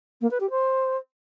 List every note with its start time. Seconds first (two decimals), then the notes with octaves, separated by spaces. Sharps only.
0.21 A#3
0.30 B4
0.40 G4
0.50 C5